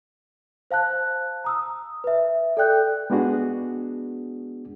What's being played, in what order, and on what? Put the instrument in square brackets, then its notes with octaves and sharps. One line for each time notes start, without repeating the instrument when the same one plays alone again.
[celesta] C5 F5 A5 F#6
A#5 D#6 E6
B4 E5
A4 D5 G5 F#6 G6
[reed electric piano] G#3 B3 D4 F#4 G#4